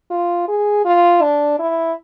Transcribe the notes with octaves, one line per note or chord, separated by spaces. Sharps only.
F4
G#4
F4
D4
E4